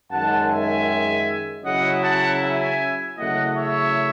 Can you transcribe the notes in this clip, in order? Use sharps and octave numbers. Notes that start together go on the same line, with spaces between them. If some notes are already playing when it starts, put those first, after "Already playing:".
F#2 D#3 G#3 F#5 A5
E5 G#5
C#3 F#3 C#4 E4 D#5 F#5
F#5 A5
E5 G#5
C#3 F#3 A3 E4 D#5 F#5
C#5 E5